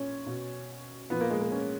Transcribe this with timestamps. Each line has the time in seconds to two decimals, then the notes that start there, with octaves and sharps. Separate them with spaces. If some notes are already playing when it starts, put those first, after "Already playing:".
Already playing: A#2 C#4
0.26 B2
1.10 A#2 F3 B3
1.21 A#3
1.30 G#3
1.41 A#3
1.52 C#4